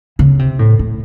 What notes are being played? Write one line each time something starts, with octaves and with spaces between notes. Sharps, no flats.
C#3
C3
A2
A2